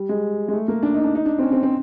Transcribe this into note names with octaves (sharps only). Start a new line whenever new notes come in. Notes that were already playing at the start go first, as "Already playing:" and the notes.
Already playing: G3
G#3
G#3
A3
A#3
D4
D#4
D4
D#4
D4
C4
C#4
C4
C4